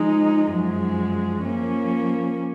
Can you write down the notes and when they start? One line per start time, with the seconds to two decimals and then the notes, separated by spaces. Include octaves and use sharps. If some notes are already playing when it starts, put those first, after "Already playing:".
Already playing: F3 G#3 D#4
0.50 F#2 F3 G#3
1.44 F3 A#3 C#4